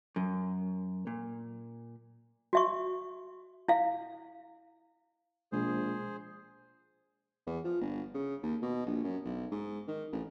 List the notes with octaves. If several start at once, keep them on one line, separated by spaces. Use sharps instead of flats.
F#2
A#2
F#4 E5 C#6
E4 F5
A#1 B2 G#3 G#4 C5
E2
F3
G1
C#3
D#2
B2
A#1
F#2
B1
G#2
D#3
A1